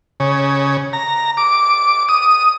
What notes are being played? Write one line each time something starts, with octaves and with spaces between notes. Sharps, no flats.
C#3
A#5
D6
D#6